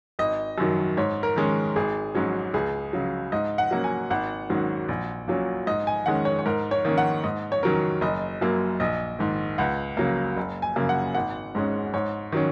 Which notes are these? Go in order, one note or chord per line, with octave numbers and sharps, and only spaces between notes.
G#1 D#5
F#2 D#3 F#3
G#2 C#5
A#4
D#3 G#3 C#4
G#1 G#4
G#2 F#3 C#4
C#2 G#4
C#3 F#3
G#2 D#5
F#5
F#3 A#3 C#4
G#5
G#1 F#5
G#2 D#3 F#3 C#4
A#1
A#2 F#3 C#4
G#2 D#5
G#5
D#3 G#3 C#4 F#5
C#5
C#5
G#2 A#4
C#5
D#3 A#3 C#4
F#5
G#2 D#5
C#5
D#3 F#3 C#4 A#4
F#1 D#5
F#2 F#3 A#3
A#1 D#5
G#2 D#3
C#2 F#5
C#3 F#3 A#3
F#1
G#5
F#2 C#3 A#3
F#5
G#1 F#5
G#2 G#3 C#4
G#2 C#5
D#3 F#3 C#4